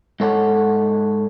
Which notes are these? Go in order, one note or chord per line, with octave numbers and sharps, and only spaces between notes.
G#2 A4 C#5 F#5